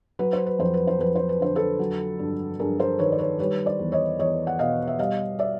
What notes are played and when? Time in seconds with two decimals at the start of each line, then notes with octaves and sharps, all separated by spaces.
0.19 F#3 B4
0.33 C5
0.46 B4
0.59 F2 C5
0.74 B4
0.87 C5
0.99 F2 B4
1.15 C5
1.29 B4
1.40 D3 C5
1.56 A4 B4
1.79 F#3
2.19 G2
2.59 G2 G#4 A#4
2.79 A#4 C5
2.99 D#3 B4 C#5
3.12 D5
3.19 B4 C#5
3.39 G3 B4 C#5
3.66 C5 D5
3.79 E2
3.92 C#5 D#5
4.19 E2 C#5 D#5
4.47 F#5
4.59 B2 D#5 F5
4.87 E5
4.99 G3 D#5 F5
5.39 D5 E5